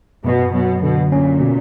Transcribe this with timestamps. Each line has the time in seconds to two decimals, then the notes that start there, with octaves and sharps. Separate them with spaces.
0.24 F#2 B2
0.54 B2 F#3
0.83 B2 D3
1.12 A#2 C#4
1.40 B2